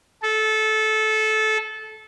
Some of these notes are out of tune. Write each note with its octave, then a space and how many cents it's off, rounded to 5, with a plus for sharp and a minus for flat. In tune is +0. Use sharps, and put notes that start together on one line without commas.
A4 -20